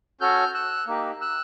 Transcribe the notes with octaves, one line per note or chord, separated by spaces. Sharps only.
C#4 F#4 A4 F6 G6
E6 F#6
A#3 D#4 G4
E6 F#6